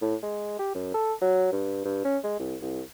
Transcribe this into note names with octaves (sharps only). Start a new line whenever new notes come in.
A2
G#3
G4
F#2
A4
F#3
G2
G2
C#4
G#3
C2
C2